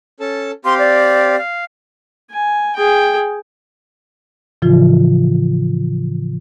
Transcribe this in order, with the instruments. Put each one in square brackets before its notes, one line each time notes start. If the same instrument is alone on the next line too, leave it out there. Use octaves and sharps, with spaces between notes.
[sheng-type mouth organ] C#4 A4 A5
[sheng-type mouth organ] C4 G4 F5 [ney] C6
[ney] D5
[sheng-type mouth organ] F5
[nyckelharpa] G#5
G#4 G5
[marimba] A2 C#3 E3 F3 F4